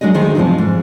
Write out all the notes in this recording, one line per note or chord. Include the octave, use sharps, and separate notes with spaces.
F#3 G#3 D4 G#4 D#5
D2 D#3 D#4 G#4 C5
E2 G#2 C3 F3 C4
G#2